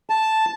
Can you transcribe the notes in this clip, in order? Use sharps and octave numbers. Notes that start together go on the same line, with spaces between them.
A5